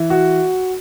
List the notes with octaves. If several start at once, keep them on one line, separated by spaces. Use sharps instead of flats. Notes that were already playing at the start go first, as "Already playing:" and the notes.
Already playing: E3
F#4